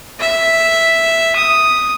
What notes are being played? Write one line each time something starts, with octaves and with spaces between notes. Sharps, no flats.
E5
D#6